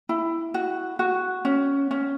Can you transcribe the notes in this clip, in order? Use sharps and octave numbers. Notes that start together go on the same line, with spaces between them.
E4
F#4
F#4
C#4
C#4